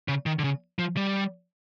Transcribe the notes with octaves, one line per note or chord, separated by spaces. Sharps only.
C#3
D#3
D3
C#3
F3
G3